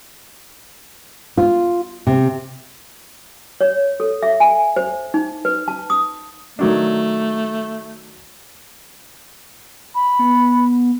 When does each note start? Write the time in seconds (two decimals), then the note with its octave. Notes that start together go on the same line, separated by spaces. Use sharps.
1.37 F4
2.07 C3
3.61 C#5
4.00 A4
4.23 E5
4.40 G#5
4.76 C5
5.14 D#4
5.45 B4
5.68 A5
5.90 D#6
6.59 D#3 F#3 A3 D4
9.95 B5
10.19 B3